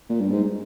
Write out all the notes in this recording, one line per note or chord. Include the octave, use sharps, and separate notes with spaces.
A#2
G2
G#2